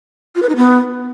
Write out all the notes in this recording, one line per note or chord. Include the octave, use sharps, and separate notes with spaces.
F4
B4
D#4
B3